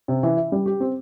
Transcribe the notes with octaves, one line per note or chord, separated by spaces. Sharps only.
C3
E3
E4
G3
G4
C4